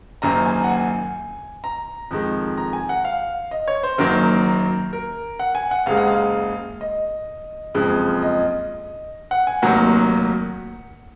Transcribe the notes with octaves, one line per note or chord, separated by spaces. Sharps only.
F#1 F#2 D#3 A#3 A#5
G#5
F#5
G#5
A#5
F2 D#3 G#3
A#5
G#5
F#5
F5
D#5
C#5
C5
F#1 F#2 D#3 F#3 A#3 A#4
A#4
F#5
G#5
F#5
F#1 F#2 C#3 G#3 F5
F#5
F5
D#5
F#1 F2 C#3 G#3
D#5
F#5
G#5
F1 D#2 D#3 F#3 A#3 F#5